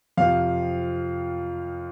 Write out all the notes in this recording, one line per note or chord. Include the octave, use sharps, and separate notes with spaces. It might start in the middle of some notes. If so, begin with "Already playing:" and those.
F2 C3 F3 F5